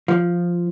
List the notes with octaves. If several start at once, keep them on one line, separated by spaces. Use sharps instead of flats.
F3